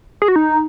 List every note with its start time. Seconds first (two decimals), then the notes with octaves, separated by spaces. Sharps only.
0.22 G#4
0.28 F#4
0.36 D#4